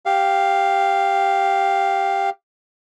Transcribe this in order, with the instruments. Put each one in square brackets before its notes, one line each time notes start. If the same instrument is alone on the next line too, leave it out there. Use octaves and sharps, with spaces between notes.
[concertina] G4 F5